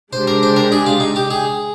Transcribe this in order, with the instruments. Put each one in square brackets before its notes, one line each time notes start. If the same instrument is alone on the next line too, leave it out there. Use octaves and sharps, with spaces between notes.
[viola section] G#3 D4 G4 [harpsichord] C5
[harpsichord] A#4
C5
A#4
G#4
F4
D#4
G4
G#4